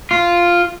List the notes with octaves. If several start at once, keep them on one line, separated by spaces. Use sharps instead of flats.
F4